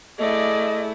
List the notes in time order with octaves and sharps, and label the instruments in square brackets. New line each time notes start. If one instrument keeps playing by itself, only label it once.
[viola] A3 E4 [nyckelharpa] G#4 D5 [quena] D#5